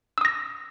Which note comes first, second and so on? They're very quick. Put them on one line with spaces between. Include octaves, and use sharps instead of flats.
E6 D#6 A#6